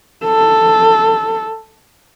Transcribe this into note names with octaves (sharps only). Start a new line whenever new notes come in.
A4